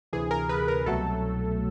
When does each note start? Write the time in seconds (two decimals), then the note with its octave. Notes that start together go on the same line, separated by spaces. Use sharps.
0.13 D2 C3 E3 G#4
0.31 A#4
0.49 B4
0.68 A#4
0.86 C2 B2 F#3 A3 A4